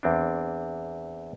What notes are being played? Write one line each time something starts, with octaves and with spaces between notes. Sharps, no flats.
E2 C4 D4